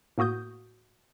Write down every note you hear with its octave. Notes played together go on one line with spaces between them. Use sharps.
A2 A#3 F#4 D#6 G6